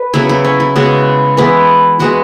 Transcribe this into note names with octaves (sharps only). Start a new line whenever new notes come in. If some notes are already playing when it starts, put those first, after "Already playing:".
Already playing: B4
C#3 F#3 B3 E4
E4
C#4
E4
C#3 G#3 B3 F#4
E3 G#3 B3 E4
E3 G#3 B3 F#4